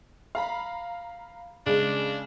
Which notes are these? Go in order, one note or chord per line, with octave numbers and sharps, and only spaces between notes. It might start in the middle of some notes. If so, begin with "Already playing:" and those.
F5 A#5 B5
C#3 G#3 D4